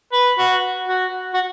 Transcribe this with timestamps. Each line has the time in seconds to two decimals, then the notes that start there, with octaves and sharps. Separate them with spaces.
0.12 B4
0.38 F#4
0.88 F#4
1.34 F#4